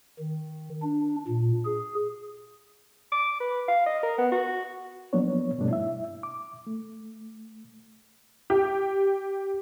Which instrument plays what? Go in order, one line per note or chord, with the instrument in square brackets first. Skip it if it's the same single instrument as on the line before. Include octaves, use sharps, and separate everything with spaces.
[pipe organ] D#3
D4
A#2
G#4
[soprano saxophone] D6
B4
F5
D#5
A#4
B3
F#4
[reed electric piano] F3 F#3 A#3 B3 D4 C#5
G2 B2 G3 A3 D4
E4 E5
D6
A3
[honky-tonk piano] G4